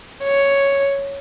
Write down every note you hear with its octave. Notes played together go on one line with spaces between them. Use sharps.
C#5